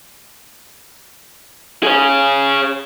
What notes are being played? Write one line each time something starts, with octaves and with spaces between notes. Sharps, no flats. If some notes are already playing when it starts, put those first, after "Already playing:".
G#4 C#5